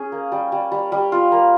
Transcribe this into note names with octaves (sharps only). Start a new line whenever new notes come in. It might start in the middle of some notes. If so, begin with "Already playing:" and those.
Already playing: C#4 G#4
A#3
G3
G3
G3
G3
F4
A#3